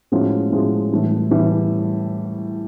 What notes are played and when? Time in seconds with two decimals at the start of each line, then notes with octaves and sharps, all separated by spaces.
0.12 A2 F3 G#3 C#4 F#4
0.51 A2 F3 G#3 C#4 F#4
0.91 A2 E3 G3
1.31 A2 E3 G3